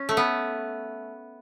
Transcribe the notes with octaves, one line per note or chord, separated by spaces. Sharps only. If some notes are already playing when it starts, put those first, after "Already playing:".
Already playing: C#4
A3
B3